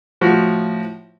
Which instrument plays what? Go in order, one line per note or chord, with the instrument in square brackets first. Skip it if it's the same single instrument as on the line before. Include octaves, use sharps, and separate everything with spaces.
[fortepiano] A2 F3 F#4